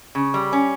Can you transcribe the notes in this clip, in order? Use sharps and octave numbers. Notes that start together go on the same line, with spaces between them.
C#3
G3
C#4